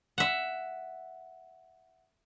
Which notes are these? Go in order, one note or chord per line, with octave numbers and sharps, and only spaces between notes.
E5 F#5